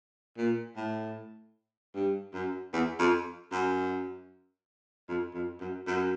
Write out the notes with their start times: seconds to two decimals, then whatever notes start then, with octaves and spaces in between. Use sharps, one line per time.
0.37 A#2
0.77 A2
1.94 G2
2.34 F#2
2.73 E2
2.99 F2
3.52 F#2
5.08 F2
5.34 F2
5.60 F#2
5.87 F#2